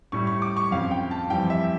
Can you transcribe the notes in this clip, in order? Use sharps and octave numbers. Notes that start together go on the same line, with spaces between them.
A2 G3 C#6
C#6
D6
C#6
F2 C#3 F3 F5
G5
A5
F2 E3 G3 G5
E5